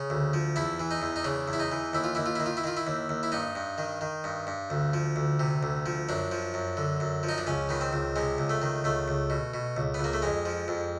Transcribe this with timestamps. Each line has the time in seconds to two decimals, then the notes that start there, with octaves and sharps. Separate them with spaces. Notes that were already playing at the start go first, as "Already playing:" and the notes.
Already playing: C#3
0.10 D2
0.33 F3
0.56 E2 E4
0.80 E3
0.91 D#4
1.02 E2
1.16 D#4
1.24 C#3 D4
1.48 E2
1.53 E4
1.60 D#4
1.72 E3
1.93 D#2 E4
2.04 F4
2.15 D#2 E4
2.26 F4
2.35 D#3 E4
2.46 F4
2.57 E4
2.64 D#3 F4
2.77 E4
2.87 D#2
3.09 D#2
3.23 E4
3.32 G2 D#4
3.55 G2
3.78 D#3
4.01 D#3
4.24 G2
4.47 G2
4.70 D2
4.93 F3
5.16 D2
5.40 C3
5.63 D2
5.86 F3
6.09 F#2 D4
6.31 F3
6.54 F#2
6.77 D3
7.00 F#2
7.23 F3
7.29 D#4
7.38 D4
7.47 C#2 C#4
7.69 D#3 B3
7.81 C4
7.93 C#2
8.16 C3 G#3
8.38 C#2
8.50 A3
8.62 D#3
8.84 C#2 A3
9.08 C#2
9.30 B2
9.54 B2
9.77 C#2
9.94 B3
9.99 C#2 A#3
10.13 A3
10.22 F2 G#3
10.45 F3
10.68 F2